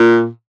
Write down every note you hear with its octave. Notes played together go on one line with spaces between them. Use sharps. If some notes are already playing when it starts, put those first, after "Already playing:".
Already playing: A#2